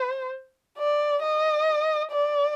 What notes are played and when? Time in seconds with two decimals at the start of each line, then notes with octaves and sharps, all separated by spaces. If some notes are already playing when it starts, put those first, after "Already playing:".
Already playing: C5
0.78 D5
1.23 D#5
2.12 D5